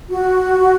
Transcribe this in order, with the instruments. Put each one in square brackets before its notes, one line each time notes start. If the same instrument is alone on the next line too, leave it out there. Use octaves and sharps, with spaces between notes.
[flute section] F#4